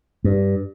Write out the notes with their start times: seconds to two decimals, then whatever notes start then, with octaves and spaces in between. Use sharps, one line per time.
0.24 G2